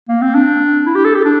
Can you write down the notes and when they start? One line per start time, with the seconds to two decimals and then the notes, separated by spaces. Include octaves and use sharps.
0.08 A#3
0.22 C4
0.35 D4
0.86 E4
0.95 G4
1.05 A4
1.15 G4
1.25 D4